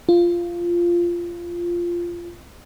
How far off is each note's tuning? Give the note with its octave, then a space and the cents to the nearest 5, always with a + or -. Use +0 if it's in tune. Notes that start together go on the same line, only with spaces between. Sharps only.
F4 -10